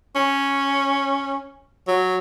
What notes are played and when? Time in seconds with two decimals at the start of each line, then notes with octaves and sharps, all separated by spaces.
0.16 C#4
1.88 F#3